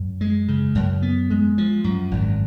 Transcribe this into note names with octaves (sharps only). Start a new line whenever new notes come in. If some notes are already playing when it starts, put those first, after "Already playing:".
Already playing: F#2
G#3
C#3
F#2
B3
G#3
F3
F#2
G#1